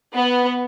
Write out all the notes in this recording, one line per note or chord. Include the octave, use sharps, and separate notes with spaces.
B3